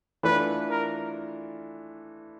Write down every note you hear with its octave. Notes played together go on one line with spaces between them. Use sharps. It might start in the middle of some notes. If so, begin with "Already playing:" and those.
E3 A3 D4 F4 A4 B4
A#4